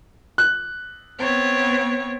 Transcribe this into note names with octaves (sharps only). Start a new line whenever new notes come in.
F#6
B3 C4 C#5